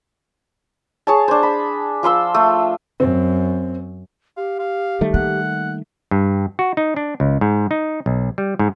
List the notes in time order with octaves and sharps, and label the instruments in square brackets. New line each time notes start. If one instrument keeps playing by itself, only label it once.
[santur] G#4 C#5 A5
D4 C5
B5
F3 F4 C6 E6
A3
[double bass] F#2 [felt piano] C4
[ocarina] G4 [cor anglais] F5
[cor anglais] F5
[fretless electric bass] D#3 G3 A3
[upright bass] A#3 [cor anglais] F#5
[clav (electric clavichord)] G2
F#4
D#4
D4
C#2
G#2
D#4
B1
G3
G#2